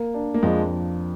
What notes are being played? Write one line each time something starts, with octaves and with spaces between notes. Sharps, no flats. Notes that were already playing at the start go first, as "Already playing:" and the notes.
Already playing: A#3
D4
A#3
F2 F3 G#3